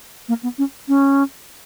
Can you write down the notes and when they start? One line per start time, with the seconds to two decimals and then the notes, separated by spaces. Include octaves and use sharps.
0.28 A#3
0.43 B3
0.58 C#4
0.88 C#4